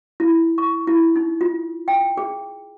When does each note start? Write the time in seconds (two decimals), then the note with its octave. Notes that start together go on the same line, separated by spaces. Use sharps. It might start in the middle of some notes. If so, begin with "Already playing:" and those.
0.20 E4
0.58 C#6
0.87 E4
1.16 D#4
1.41 F4
1.88 G5
2.17 G#4